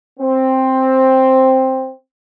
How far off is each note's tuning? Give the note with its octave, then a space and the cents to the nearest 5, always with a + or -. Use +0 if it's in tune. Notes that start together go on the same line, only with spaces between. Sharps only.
C4 +5